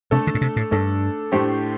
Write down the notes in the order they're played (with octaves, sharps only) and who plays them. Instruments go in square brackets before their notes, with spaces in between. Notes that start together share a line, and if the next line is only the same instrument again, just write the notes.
[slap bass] C3 [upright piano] A3 D4 A4
[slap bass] D3
A2
C3
A2
[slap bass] G2 [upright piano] A3 D4 A4
[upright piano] A2 A3 D4 G4 C5